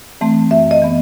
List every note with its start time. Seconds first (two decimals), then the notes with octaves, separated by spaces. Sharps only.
0.21 E3 A3 C4
0.51 F#2 E5
0.71 D#5
0.82 E3 B3